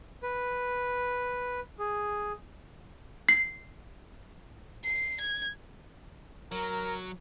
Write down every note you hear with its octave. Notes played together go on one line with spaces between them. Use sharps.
B4
G#4
C7
C7
G#6
F#3 A#4